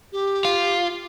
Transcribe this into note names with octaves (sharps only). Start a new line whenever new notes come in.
G4
F4